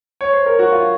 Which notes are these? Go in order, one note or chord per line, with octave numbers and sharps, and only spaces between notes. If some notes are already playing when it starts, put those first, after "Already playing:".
C#5
C5
A#4
F#4
F4